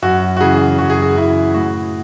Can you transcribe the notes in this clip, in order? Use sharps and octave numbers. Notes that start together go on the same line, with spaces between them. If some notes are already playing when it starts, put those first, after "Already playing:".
F#2 F#4
F#4
C#3 E3 G#4
F#2 F#4
G#4
F#4
C#3 E3 E4
A2 F#4